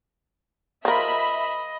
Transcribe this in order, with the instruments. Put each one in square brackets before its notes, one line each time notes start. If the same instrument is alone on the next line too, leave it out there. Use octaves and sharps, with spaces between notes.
[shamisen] F3 A#4 [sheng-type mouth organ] D#5 [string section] E5 B5